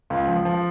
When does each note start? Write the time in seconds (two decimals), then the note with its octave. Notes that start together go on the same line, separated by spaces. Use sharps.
0.10 C#2
0.27 F3
0.45 F3